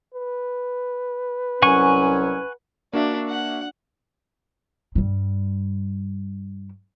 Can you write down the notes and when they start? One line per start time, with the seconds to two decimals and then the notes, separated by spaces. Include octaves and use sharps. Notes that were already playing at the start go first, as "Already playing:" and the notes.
0.14 B4
1.62 C2 F#3 C#4 F#5 G#5 C#6
2.93 A#3 D4 F#4 E5
3.28 F#5
4.95 G2 G3